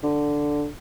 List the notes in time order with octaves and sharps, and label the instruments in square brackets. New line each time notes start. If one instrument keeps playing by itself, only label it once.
[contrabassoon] D3